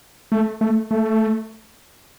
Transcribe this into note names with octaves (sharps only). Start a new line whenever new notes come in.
A3
A3
A3